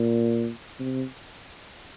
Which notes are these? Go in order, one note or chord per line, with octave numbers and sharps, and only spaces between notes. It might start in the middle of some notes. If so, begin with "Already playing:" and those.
Already playing: A#2
C3